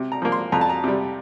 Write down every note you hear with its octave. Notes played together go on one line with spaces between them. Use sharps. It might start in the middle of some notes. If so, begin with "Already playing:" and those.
Already playing: C3
A#5
F3 A#3
C6
F2 A#5
A5
A#5
C3 G3